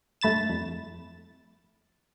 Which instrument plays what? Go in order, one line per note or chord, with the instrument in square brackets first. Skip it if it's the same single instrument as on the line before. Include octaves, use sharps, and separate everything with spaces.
[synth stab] G2 A3 B5 A6 E7
F2